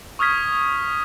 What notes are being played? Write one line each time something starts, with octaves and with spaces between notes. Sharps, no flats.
C#6 D#6 F6 G#6 B6